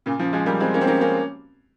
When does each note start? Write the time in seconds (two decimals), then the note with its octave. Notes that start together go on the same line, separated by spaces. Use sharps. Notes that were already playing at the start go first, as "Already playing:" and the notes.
0.06 A#2 C#3
0.19 C#3 F3
0.33 F3 G#3
0.46 G3 A#3
0.60 G#3 C4
0.74 A#3 C#4
0.81 C4
0.87 A#3 C#4
1.01 A#3 C#4